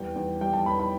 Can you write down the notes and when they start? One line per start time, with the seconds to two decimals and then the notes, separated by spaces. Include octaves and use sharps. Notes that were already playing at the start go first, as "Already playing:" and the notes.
Already playing: E2 G3 G5
0.15 E2
0.41 G3 G5
0.53 A5
0.66 E2 B5
0.80 B5